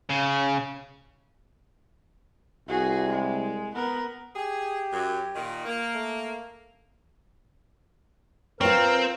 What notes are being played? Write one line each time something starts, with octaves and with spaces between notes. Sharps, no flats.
C#3
C2 F#4 G#4
G#3
B3 A#4
G4 G#4
F#2
A#2 D#3
A#3
A3
C4 F4 A#4 B4 C#5